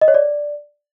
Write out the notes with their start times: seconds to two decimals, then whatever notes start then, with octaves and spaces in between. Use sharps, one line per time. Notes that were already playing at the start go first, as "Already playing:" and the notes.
0.01 D#5
0.08 C#5
0.14 D5